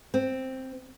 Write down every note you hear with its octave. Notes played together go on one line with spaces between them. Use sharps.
C4